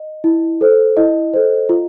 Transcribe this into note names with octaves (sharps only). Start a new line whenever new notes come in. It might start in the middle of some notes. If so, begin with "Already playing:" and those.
Already playing: D#5
E4
A4 C5
E4 D#5
A4 C5
F4